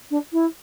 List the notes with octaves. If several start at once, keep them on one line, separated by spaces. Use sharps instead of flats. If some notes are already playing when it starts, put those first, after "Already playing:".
D4
E4